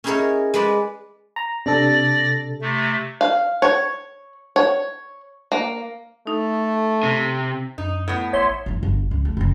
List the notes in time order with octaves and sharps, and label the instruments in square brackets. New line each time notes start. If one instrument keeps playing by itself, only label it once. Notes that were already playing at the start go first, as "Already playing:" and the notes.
[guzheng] C#4 D#4 E4 G#4 A#4 C#5
G#3 B4 D5
[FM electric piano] A#5
[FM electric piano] C3 D4 A4 [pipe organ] D5 A#6
[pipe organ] C3 A3
[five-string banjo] F5
C#5
C#5
A#3
[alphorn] A3 [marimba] D#4
[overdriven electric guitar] C3
[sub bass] F#2 [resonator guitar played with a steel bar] D#4
[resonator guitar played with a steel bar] A2 B3
[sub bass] A1 [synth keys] C#5 E5 C6
[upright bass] A1 G2
G1
C#2
A3
F#1 C#2